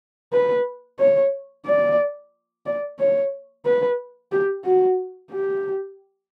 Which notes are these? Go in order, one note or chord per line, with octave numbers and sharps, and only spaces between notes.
B4
C#5
D5
D5
C#5
B4
G4
F#4
G4